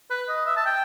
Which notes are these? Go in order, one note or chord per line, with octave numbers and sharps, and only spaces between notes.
B4
D#5
E5
A5
G5